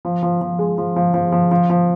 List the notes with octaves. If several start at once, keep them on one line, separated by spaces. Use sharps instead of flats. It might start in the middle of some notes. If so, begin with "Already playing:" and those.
F3
F3
F3
G#3
F3
F3
F3
F3
F3
F3